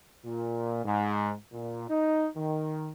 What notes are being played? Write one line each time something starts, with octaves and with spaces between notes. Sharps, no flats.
A#2
G#2
A#2
D#4
D#3